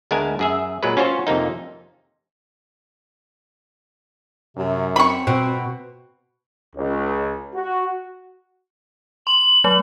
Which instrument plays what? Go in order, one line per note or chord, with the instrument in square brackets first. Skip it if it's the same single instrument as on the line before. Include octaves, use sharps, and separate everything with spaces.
[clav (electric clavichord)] D2 G#3 B3 A#4 G#5 A5
F#2 G#4 E5
A#2 F#3 G#3 B4
C#4 F4 F#4 C5 C#5
F2 C3 A#3 D#4
[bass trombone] F#2 [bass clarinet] C3
[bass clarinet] C4 [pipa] B5 C#6
[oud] B2 [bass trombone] C4 [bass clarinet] F#4
[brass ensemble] C#2
F#4
[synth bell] C6 [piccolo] F#7
[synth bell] F#3 A3